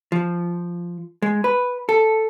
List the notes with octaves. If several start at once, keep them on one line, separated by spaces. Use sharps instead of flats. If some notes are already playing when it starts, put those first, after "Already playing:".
F3
G#3
B4
A4